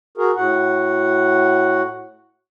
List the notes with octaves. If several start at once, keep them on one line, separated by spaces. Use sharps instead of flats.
F#4 G#4 A#4
A2 F#4 F#5